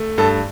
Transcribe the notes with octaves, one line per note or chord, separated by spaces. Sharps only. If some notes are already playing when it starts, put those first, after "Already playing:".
Already playing: A3
G2 A4